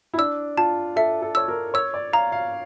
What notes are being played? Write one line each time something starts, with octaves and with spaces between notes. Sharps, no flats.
E4
D4 E6
F4 A5
A4 E5
A4
C#5 E6
A#4
C#5 E6
D5
F5 A#5
F5